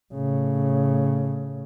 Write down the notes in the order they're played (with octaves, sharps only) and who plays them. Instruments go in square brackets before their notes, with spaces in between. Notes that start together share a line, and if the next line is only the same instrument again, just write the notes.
[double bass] A2 C#3